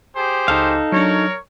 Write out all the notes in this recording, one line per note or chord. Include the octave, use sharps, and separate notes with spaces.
G4 G#4 C5
C#2 D#4 A4 F5
F#3 D4 A#4 C#5